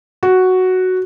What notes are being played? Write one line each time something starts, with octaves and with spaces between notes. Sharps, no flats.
F#4